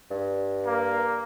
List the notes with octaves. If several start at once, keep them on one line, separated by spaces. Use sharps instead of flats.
G2
A#3